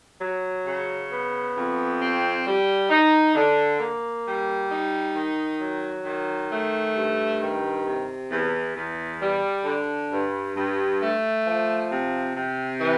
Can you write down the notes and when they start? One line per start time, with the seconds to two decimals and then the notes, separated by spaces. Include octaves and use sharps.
0.21 F#3
0.65 C#3
1.11 B3
1.55 F2
2.01 C4
2.46 G3
2.90 D#4
3.35 D3
3.80 A#3
4.26 G3
4.70 D#4
5.16 D#3
5.60 F#3
6.05 D#3
6.50 A3
6.95 G2
7.41 D#3
7.85 C3
8.31 E2
8.75 E2
9.20 G3
9.65 D3
10.10 G2
10.55 G2
11.00 A3
11.45 F3
11.90 C3
12.35 C3
12.79 E3